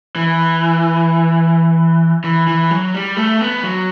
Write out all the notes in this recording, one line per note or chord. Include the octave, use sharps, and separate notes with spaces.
E3
E3
E3
F#3
G3
A3
B3
F#3